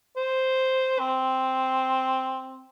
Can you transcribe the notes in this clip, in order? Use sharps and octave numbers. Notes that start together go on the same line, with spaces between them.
C5
C4